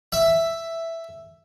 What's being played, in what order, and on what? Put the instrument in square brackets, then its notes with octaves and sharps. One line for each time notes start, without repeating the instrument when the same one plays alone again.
[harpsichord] E5